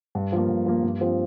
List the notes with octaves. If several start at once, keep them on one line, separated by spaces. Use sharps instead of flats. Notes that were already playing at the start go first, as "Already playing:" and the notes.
G2
F3 A#3
G2
F3 A#3
G2
F3 C4 G4